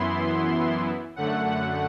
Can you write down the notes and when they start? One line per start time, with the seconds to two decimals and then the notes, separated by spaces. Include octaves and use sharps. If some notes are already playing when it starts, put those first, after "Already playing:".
Already playing: F#2 E3 B3 E4 C6
1.16 F#2 D3 A3 F#5